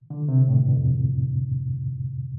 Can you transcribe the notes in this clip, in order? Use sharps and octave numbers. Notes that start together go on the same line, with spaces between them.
D3
C3
A2
G2
F2